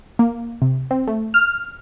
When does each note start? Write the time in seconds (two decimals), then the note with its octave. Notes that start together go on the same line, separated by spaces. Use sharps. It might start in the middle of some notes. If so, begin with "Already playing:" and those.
0.19 A#3
0.62 C3
0.91 C4
1.07 A3
1.34 F6